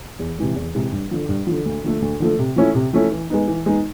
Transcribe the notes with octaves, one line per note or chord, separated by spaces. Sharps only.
E2
C3 E3 G#3
E2
C3 E3 G#3
G2
D3 F3
G2
D3 F3
D2
D3 F3 A3
D2
D3 F3 A3
C3
F3 A3 C#4 E4
C3
F3 A3 C#4 E4
E3
G#3 B3 D#4
E3
G#3 B3 D#4